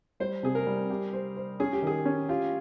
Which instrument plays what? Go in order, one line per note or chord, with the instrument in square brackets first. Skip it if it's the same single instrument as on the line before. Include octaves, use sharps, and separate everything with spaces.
[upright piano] G3 [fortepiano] C5
[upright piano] C3 [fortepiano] G#4
[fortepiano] A#4
[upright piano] G3
G4
C5
C5
[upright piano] C#4 [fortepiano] G#4
[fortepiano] G4
[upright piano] D#3 [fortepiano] G#4
[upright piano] C#4
[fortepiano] F4 [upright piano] G4